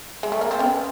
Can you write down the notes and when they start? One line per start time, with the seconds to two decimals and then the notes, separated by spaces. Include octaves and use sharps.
0.23 G#3
0.32 A3
0.41 A#3
0.51 C4
0.59 B3 C#4